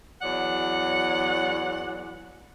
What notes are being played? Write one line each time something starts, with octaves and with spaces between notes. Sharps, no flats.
E2 F#3 D5 F#5